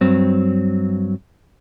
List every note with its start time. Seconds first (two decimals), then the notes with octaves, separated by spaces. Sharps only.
0.01 G2 F#3 C4